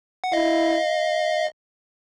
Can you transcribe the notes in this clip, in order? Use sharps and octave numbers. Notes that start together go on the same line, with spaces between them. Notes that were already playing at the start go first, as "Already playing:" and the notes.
F#5
E4 D#5 F5